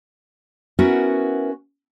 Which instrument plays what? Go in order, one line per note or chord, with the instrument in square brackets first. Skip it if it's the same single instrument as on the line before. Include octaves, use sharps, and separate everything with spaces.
[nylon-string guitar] B3 C#4 E4 F#4 A#4